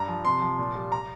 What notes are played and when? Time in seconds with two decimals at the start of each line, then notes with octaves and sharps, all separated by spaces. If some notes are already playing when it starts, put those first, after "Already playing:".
Already playing: G2 A#5
0.08 F3
0.25 C3 C6
0.41 F3
0.59 A#2
0.75 G3
0.92 A#5